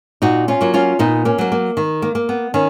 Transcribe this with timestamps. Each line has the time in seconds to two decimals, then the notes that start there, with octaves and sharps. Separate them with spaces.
0.22 A#2 D#4 F#4
0.48 C#4 F4
0.61 F#3 A#3
0.74 C#4 F4
0.99 A#2 B3 D#4
1.25 A#3 C#4
1.38 F#3 A#3
1.52 A#3
1.77 D#3
2.02 A#3
2.15 A#3
2.29 B3
2.54 D#3 C#4